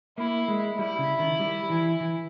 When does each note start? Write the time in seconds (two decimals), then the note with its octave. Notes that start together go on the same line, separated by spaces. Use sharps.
0.18 A#3 E4
0.48 G#3
0.79 G3 E4
0.98 C#3
1.19 D#3
1.39 G3
1.70 E3
2.00 E3